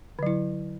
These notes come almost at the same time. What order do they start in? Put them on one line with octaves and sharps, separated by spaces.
D3 F#3 E4